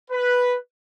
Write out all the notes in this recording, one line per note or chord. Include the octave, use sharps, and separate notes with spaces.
B4